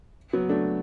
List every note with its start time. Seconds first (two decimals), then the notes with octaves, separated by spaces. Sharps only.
0.33 F#3 B3
0.49 A3 D4